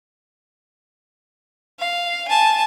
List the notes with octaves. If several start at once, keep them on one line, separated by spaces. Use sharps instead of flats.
F5
G#5 A5